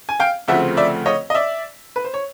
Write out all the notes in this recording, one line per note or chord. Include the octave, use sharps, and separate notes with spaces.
G#5
F5 G5
D2 C#3 F3 A3 C4 E5 F#5
D5 E5
C#5 D#5
D#5
D5 E5
B4
C5
C#5